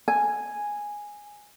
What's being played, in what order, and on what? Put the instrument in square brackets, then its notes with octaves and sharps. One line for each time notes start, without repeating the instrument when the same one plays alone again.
[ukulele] G#5